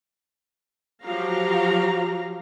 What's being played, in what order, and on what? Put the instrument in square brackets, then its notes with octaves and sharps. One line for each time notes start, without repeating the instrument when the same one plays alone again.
[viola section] F3 F#3 F#4 G4 F5 A#5